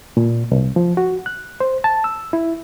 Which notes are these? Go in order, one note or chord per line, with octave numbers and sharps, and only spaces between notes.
A#2
C2
F3
F#4
F#6
C5
A5
E6
E4